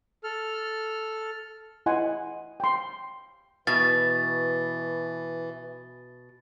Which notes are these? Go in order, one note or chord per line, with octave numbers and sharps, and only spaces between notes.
A4 F6
E4 D#5 F#5 G#5 C6
G5 C6
B2 E3 A6